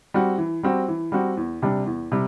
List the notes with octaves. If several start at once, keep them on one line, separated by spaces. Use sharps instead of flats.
G3 C4 F#4
E3
G3 C4 F#4
E3
G3 C4 F#4
E2
C3 G3 D4
E2
C3 G3